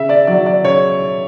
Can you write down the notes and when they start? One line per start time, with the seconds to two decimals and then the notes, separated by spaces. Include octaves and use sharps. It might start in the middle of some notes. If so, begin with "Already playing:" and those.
Already playing: C#3 E5
0.09 D5
0.27 F#3 D5
0.46 D5
0.64 C#3 C#5